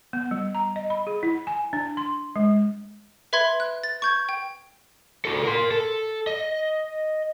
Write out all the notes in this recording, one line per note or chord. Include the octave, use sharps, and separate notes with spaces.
B3
G3
A#5
D#5
B5
G#4
E4
G#5
D4
C6
G#3
B4 E5 B5 C6 G#6
F#6
A6
C#6 G6 G#6
G5
F#4 A4
A#4 C6
A4
D#5